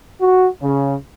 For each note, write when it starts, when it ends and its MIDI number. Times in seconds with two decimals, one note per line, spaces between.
0.20 0.48 66
0.61 0.95 49